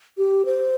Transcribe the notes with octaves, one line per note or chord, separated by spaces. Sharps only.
G4
C5